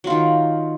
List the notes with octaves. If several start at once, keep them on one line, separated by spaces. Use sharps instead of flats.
D#3 F#3 F4